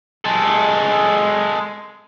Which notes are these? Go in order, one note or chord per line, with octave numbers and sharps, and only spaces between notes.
G#3 A4